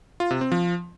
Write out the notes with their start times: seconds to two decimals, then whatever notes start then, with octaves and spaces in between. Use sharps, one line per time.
0.20 F4
0.31 C3
0.41 C4
0.52 F3